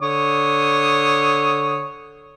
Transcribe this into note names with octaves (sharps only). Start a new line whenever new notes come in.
D3 C#5 D#6